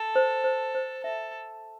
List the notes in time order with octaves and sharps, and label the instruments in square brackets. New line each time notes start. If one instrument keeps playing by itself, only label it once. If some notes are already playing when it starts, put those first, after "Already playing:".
Already playing: [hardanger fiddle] A4
[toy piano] C5
C5
C5
[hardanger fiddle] A4 [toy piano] E5